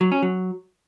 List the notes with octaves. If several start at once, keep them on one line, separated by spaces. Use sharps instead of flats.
F#3
C#4
F#3